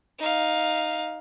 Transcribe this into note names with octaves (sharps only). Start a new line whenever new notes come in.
D#4 F5